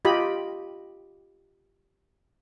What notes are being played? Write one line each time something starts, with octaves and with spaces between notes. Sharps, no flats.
F4 G4 D#5 B5